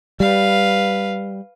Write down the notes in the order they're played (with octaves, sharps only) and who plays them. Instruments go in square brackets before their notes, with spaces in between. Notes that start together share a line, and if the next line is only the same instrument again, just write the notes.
[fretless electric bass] G3 [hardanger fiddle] B4 F5